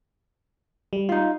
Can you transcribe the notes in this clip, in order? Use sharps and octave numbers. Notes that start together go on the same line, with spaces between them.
G3
D#4 F4